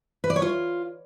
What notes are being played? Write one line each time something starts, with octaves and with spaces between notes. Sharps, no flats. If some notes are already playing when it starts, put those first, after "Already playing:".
B4
D5
C#5
F4